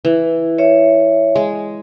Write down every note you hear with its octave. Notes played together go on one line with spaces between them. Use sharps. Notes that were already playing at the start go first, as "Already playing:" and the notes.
E3
C#5 E5
G#3